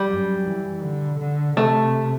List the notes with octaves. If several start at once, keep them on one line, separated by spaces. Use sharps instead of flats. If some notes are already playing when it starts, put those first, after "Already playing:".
Already playing: G3
F#2
E3
D3
D3
C3 A3